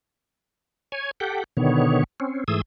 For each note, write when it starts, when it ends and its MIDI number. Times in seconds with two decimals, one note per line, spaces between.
0.92 1.11 73
0.92 1.11 80
1.20 1.44 67
1.20 1.44 69
1.20 1.44 78
1.20 1.44 79
1.57 2.04 47
1.57 2.04 50
1.57 2.04 51
1.57 2.04 59
1.57 2.04 73
2.20 2.44 60
2.20 2.44 61
2.48 2.61 44
2.48 2.61 52
2.48 2.61 57
2.48 2.61 68
2.48 2.61 87
2.48 2.61 88